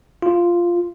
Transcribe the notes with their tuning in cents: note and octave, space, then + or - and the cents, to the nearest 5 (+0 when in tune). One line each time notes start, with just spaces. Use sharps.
F4 -5